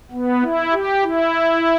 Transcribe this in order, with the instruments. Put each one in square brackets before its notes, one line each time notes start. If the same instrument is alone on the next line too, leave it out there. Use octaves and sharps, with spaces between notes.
[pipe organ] B3
E4
G4
E4